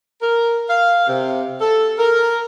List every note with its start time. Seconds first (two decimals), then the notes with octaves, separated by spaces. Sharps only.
0.21 A#4
0.69 F5
1.07 C3
1.60 A4
1.98 A#4